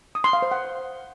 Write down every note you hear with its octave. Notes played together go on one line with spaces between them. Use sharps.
D#6
C6
F5
C5
F#5